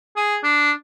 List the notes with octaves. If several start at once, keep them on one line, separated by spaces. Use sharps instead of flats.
G#4
D4